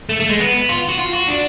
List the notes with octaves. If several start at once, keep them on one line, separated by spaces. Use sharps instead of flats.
A3
A3
G#3
B3
F4
F#4
F4
F#4
D4